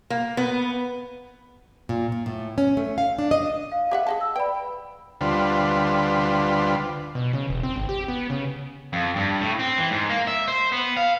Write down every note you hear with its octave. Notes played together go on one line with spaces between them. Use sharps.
A#3
B3
A#2
A#2
A2
C#4
A3
F5
D4
D#5
F5
G4 E5 F#5
G#4 D#5 A5
E6
B4 D5 G5 B5
D2 D3 G3 F4 B4 C5
B2
C#3
E1
C4
G#1
G4
B3
C#3
F2
G2
A2
C4
E3
G#2
A#3
E5
C5
B3
F5